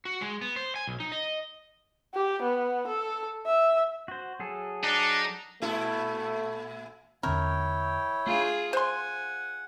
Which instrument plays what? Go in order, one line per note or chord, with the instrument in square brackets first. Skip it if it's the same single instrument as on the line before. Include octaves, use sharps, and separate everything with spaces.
[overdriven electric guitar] F#4
G#3
B3
C5
G#5
B1
D#4
D#5
[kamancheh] G4
B3
A4
E5
[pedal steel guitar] F#4 C5
F#3 G#4 A4
[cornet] D4 [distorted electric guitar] D#4
[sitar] A#2 E4 A4 [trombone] A3
[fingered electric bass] E2 D3 C4 [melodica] E4 C#5 G5 [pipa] A#4
[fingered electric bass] A3 D4 [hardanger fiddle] F4 G#4
[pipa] C5 C6 [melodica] F#5 [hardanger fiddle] G#5